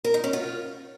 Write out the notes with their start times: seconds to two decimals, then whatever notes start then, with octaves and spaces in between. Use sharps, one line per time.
0.04 A#4
0.14 D#4
0.24 C#4
0.33 F4